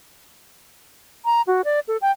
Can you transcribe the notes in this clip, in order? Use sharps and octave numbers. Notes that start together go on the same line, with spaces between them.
A#5
F#4
D5
A4
G5